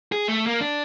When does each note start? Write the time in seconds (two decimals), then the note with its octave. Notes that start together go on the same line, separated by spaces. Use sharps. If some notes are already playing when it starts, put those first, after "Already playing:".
0.12 G#4
0.27 A3
0.47 A#3
0.61 D4